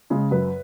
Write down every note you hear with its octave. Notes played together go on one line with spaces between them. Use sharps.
C#3 G#3
F#2 B4